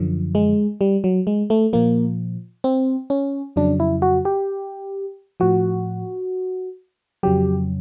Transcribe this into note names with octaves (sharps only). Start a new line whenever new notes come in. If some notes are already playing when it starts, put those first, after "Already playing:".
Already playing: F#2 D3 F3
G#3
G3
F#3
G#3
A3
A#2 F3 A#3
C4
C#4
F2 C#3 F#3 D4
E4
F#4
G4
A2 F3 F#4
F2 C#3 F#3 G4